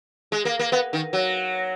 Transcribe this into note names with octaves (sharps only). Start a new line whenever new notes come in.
G#3
A#3
A#3
B3
D#3
F#3